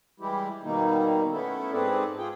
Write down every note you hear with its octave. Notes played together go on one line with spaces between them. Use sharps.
E3 G3 G#3 E4 G4
B2 D#3 G3 A#3 D#4
A3 B3 C#4 E4 A4
G#2 C4 G#4 A4 B4 D5
F4 G#4 G5